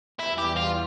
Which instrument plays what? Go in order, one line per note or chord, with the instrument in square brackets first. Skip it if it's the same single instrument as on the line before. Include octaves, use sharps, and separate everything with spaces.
[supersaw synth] E2 E3 G3 [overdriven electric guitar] E4
[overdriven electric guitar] G4
F4